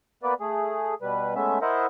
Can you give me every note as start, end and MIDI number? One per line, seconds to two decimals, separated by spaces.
0.23 0.34 58
0.23 0.34 59
0.23 0.34 71
0.23 0.34 74
0.40 0.95 57
0.40 0.95 68
1.02 1.34 47
1.02 1.34 55
1.02 1.34 71
1.35 1.59 56
1.35 1.59 57
1.35 1.59 59
1.35 1.59 61
1.35 1.59 76
1.62 1.86 64
1.62 1.86 70
1.62 1.86 72
1.62 1.86 75
1.62 1.86 76
1.62 1.86 78